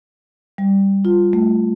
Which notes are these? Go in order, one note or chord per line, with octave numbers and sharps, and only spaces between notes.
G3
F4
A3